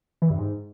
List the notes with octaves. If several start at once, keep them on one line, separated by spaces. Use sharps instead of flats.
E3
G2
G#2